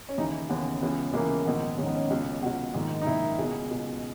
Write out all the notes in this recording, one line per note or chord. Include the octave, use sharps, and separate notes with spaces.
C#4
D#2 C#3 E3 D#4
D#2 C#3 E3 B3
C#2 C#3 E3 B3
C#2 C#3 E3 A#3
A#1 G#2 D#3 B3
A#1 G#2 D#3 C#4
B3
C#4
C#2 B2
C#2 B2 F#4
A#1 G#2 D#3
D#4
A#1 G#2 D#3 E4
C#2 B2 G#4
C#2 B2